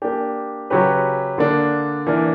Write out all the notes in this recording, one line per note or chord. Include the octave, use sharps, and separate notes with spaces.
A#3 D4 G4
C#3 F#3 C#4 G4 B4
D3 A#3 D4
E3 A#3 D4 A#4